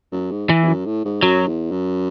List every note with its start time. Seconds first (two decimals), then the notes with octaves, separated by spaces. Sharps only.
0.12 F#2
0.31 G#2
0.49 E3
0.63 E2
0.68 F#2
0.86 A2
1.05 G#2
1.22 F#2 F#3
1.48 E2
1.71 F#2